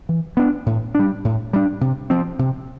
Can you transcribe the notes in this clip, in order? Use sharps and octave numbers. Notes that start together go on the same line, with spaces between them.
E3
B3 D4
A2
G3 D4
A2
G3 D4
C3
F3 C4
C3